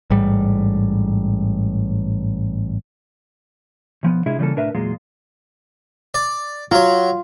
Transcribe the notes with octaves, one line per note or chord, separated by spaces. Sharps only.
A1 G#2 G3
B1 F3 B3
C3 G#3 D4 E4 F4 G#4
C#3 E3 G3 A#3 F4 A4
C2 A2 D4 A#4 B4 E5
E2 A#2 F#3 G#3 F4
D5
F#3 F4 C#5